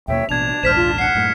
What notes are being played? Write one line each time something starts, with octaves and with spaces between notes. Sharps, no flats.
D#2 B2 A#3 C#5 E5 G5
A1 B2 D4 A5 G#6 F7
A#1 D#2 G#2 C5 F6 B6 E7
F4
F#5 C7 C#7
F#2 A2